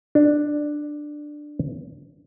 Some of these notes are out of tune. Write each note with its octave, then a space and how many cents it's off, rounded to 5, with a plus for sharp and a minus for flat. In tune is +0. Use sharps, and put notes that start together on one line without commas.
D4 +10